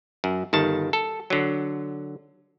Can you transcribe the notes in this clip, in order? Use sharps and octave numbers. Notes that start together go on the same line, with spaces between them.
F#2
G1 D#3 A5
A4
D3 F#3